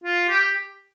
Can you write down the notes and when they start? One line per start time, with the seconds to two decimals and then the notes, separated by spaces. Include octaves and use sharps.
0.04 F4
0.29 G4